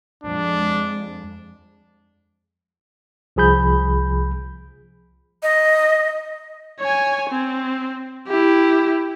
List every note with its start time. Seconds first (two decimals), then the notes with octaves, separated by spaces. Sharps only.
0.24 F2 G#3 D4
3.36 C2 F3 G#4 B5 G6
5.43 D#5
6.80 C#5 G#5
7.30 C4
8.28 E4 G4